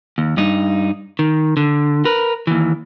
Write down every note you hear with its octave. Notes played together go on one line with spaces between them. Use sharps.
D#2
G2 D#4
D#3
D3
A#4 B4
D#2 E3